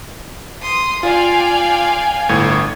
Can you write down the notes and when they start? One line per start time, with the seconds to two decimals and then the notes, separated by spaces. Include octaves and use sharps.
0.63 C6 D#6
1.03 F4 D5 F5 G5 G#5
2.29 G1 A2 G#6